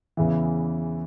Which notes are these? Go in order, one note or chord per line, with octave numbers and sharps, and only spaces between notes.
E2 C#3 E3